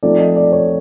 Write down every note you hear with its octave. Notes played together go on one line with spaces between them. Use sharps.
F3 A3 C4 D#4 D5
D#5
D5
C#5